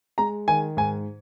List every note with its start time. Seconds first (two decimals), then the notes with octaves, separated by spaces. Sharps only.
0.18 G#3 A#5
0.48 D#3 G#5
0.77 G#2 G#5